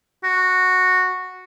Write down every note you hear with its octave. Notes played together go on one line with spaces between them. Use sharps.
F#4